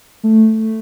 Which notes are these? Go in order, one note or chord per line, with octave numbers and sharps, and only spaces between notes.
A3